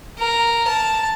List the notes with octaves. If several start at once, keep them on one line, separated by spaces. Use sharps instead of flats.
A#4
A5